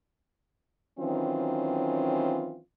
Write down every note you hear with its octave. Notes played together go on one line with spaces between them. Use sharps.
D#3 E3 F#3 C4 C#4 F4